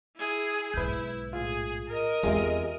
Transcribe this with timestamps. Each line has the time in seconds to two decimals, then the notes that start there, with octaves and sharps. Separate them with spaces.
0.16 E4 G#4
0.74 B1 G#2 E4 B4 G6
1.33 A2 F4 G#4
1.87 A#4 D#5
2.23 E2 G#3 C4 F4 G4 E5